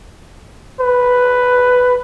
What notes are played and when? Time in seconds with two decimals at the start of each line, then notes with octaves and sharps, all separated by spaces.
0.80 B4